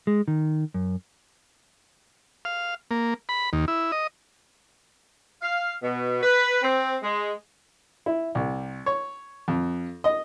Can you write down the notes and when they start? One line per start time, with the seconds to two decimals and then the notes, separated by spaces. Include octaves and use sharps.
0.07 G#3
0.28 D#3
0.74 F#2
2.45 F5
2.91 A#3
3.29 B5
3.53 D#2
3.68 E4
3.92 D#5
5.42 F5
5.83 B2
6.23 B4
6.63 C4
7.03 G#3
8.06 E4
8.35 C2
8.86 C#5
9.48 F2
10.04 D#5